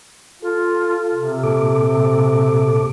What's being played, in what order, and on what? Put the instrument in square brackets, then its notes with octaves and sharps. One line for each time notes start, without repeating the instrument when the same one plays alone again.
[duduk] F4 [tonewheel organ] A4
[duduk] C3
[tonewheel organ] A#2 A4 D6